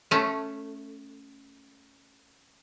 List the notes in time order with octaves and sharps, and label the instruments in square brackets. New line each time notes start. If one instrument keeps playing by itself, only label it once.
[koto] A3 C#4